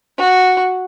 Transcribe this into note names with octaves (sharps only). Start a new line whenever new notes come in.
F#4